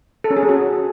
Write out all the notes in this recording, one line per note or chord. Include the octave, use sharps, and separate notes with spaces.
A4
C#4
G#4
C#4
F#4